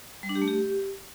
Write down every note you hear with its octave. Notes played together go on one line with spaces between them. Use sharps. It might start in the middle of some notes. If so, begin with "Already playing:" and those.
G3
D4
G4
A3
G4